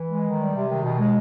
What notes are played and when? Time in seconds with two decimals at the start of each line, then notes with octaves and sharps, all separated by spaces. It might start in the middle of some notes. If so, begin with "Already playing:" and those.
Already playing: E3
0.09 G#3
0.23 D#3
0.39 G3
0.53 C3
0.69 D#3
0.83 B2
0.98 G#3